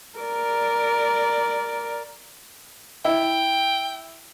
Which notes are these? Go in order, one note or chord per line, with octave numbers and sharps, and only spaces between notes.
A#4 D5
E4 G5